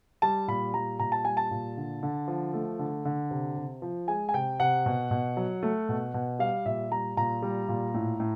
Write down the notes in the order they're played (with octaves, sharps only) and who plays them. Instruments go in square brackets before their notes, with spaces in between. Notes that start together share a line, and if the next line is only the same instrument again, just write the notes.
[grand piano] G3 A5
A#2 B5
G3 A#5
A#2 A#5
A5
G3 G#5
A5
A#2
D3
D3
F3
A3
D3
D3
C3
C3
F3
G#3 G#5
G#5
C3 G5
C3 F#5
B2
B2
F#3
A3
B2
B2
G3 F5
A#2 E5
G3 A#5
A#2 A#5
G3
A#2
A2
A2